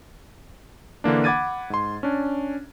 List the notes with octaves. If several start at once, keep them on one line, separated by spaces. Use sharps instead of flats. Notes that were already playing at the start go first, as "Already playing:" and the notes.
D3 E3 A#3 D4
F#5 B5 D6 G#6 A6 D#7
G#2 C6
C#4 D4